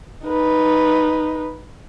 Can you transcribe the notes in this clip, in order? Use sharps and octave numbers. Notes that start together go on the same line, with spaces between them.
D#4 B4